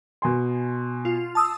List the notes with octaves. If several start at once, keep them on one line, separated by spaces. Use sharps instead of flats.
B2 G#5 C6
F4
A5 D#6 E6